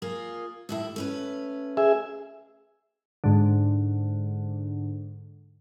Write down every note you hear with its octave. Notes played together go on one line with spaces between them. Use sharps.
A#3 F4 G#4
D#2 A2 E4
A3 C#4 B4
G#4 E5
G#2 D3